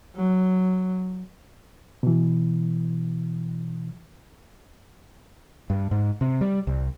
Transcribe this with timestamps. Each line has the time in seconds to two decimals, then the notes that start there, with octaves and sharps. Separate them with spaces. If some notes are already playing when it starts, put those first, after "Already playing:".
0.15 F#3
2.03 B2 E3
5.70 G2
5.91 G#2
6.21 C3
6.41 G3
6.67 C2